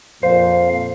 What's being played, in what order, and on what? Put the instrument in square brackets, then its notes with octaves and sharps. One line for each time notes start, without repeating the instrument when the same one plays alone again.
[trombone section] F2 A#2 [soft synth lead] C5 [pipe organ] F5